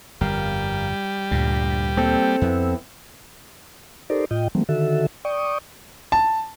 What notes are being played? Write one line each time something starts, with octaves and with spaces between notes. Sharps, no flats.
G1 F2 G3 A#4 F5
D2 G2 A#2
A#3 C4 A4
F2 B3 E4
D#4 G4 A4 A#4 C5 D5
A2 F4 D#5 G5
E3 F#3 G3 A3 A#3 C4
D3 D#3 F#4 A4 E5
D5 G5 C#6 D#6
A5